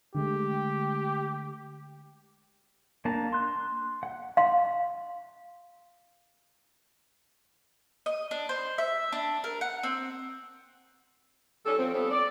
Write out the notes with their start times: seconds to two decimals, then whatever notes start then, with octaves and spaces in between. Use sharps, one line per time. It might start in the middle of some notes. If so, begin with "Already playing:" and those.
0.15 D3 G#3 A3 G4
3.05 A#3 D4 A5 A#5
3.33 C6 F#6
4.03 F#5
4.37 F5 C6
8.06 D#5
8.31 D4
8.49 C5
8.78 E5
9.12 D4
9.44 A#4
9.61 F#5
9.83 C4
11.65 G3 C#4 D#4 A4
11.77 F3 C4
11.93 G3 B3 C#4 A4
12.11 D5